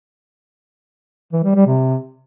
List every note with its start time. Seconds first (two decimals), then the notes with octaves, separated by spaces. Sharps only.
1.33 E3
1.44 G3
1.55 G3
1.67 C3